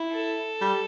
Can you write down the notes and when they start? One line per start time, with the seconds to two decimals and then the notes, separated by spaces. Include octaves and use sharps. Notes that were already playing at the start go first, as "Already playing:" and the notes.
Already playing: E4
0.12 A4
0.61 G3